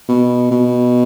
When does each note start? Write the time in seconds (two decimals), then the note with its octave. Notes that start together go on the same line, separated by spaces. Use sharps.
0.08 B2
0.51 B2